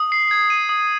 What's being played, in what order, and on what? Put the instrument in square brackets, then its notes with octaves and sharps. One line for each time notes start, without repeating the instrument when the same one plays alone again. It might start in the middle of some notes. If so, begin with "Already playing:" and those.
Already playing: [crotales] D#6
C7
G#6
D#7
D#6